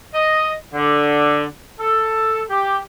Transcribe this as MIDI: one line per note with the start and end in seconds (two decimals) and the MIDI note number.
0.15 0.53 75
0.74 1.44 50
1.79 2.43 69
2.50 2.79 67